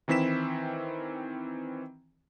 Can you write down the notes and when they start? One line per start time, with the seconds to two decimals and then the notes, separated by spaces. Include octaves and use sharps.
0.08 D#3 E3 C4 E4 B6 E7